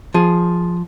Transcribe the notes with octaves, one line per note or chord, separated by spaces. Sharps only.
F3 G#4